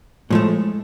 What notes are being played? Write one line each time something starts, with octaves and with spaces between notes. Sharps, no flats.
A2 F3 G#3 A3